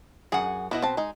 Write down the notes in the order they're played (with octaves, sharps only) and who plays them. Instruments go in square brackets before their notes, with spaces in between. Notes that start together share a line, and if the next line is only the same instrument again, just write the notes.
[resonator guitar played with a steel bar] F#2 F#5 [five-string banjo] G#4
[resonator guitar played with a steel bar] B2 [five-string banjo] B3 E4 D#5
[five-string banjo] C4 A5
G#3 D#4